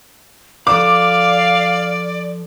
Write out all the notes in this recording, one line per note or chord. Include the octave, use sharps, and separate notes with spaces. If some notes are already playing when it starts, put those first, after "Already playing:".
F3 A4 B4 D5 F5 D6